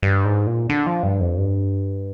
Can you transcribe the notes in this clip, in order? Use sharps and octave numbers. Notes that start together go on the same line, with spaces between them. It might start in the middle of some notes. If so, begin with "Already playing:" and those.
G2
G#2
A#2
D3
F3
G2
F2
G2